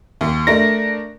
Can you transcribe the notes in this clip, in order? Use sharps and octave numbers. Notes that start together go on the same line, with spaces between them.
D#2
A3 D4 A#4 A#6